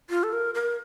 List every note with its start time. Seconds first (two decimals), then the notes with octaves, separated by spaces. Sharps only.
0.10 F4
0.23 A4
0.33 A#4
0.55 A#4